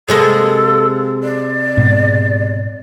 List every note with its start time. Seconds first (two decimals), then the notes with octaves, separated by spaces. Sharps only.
0.09 C3 G#3 A#3 A4
1.23 D5
1.77 G#2 B2